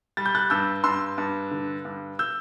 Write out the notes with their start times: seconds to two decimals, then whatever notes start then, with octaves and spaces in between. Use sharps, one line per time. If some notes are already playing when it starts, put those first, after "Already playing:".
0.17 G3 A6
0.26 G6
0.35 F#6 A6
0.50 G2 E6 G6
0.84 G2 C6 E6
1.18 G2
1.51 D3
1.85 G2
2.19 E6 G6